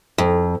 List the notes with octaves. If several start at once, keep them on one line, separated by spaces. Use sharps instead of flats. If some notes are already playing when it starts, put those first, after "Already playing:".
F2